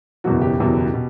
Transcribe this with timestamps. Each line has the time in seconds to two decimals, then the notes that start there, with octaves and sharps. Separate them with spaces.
0.24 F#1 E2 B2 F#3 F#4
0.41 G4
0.58 F#1 E2 B2 F#3
0.94 B2